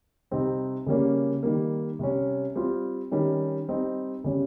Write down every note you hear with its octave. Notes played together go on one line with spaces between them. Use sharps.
C3 G3 C4 D#4
C#3 G3 A#3 C#4
D#3 G3 A#3
C3 G3 C#4
G3 C4 F4
D#3 G3 C#4
G3 C4 D#4
C#3 G3 C#4